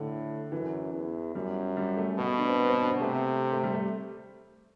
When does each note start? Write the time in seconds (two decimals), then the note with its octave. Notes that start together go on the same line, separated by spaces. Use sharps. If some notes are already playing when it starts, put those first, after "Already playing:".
Already playing: A2 D3
0.52 F#2 E3
0.93 E2
1.35 F#2 G3
1.77 G3
1.97 A3
2.18 B2 B3
2.28 B3
2.38 D4
2.50 C4
2.60 B3
2.69 C4
2.80 D4
2.90 C4
3.00 C3 A3
3.53 A3
3.63 G3
3.73 A3